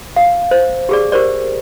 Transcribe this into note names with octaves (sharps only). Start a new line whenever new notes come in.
F5
C5
G4 G#4 D5
G4 A#4 C5 D5